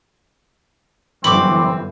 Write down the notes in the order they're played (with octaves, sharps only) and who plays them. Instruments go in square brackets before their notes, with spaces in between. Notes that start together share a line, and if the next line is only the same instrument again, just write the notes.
[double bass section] G1 F#2 E3 [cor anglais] C4 [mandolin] B5 C#6 D6